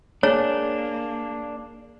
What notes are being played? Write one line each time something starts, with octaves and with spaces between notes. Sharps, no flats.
A#3 D4 G#4 C#5